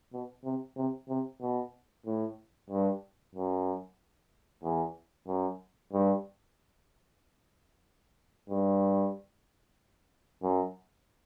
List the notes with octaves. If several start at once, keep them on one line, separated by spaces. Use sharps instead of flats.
B2
C3
C3
C3
B2
A2
G2
F#2
E2
F#2
G2
G2
F#2